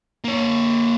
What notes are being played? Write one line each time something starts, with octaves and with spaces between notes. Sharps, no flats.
A#3 C#5